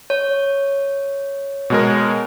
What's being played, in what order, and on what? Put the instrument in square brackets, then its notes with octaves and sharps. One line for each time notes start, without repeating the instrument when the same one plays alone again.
[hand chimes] C#5
[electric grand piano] B2 G#3 A#4